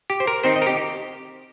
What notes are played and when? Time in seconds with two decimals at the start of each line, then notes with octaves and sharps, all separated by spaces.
0.10 G4
0.20 C5
0.27 A#4
0.44 D#3 C4 D#4 C5
0.56 D#5
0.62 A#4
0.66 G4